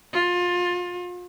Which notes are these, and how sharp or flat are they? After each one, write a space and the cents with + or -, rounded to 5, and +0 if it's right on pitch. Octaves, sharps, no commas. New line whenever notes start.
F4 +25